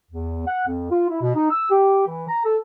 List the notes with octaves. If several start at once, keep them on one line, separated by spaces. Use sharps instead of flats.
E2
F#5
F2
F4
E4
B2
D#4
E6
G4
E3
A#5
A4